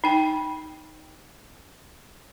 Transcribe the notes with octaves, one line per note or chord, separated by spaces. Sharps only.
D#4 G5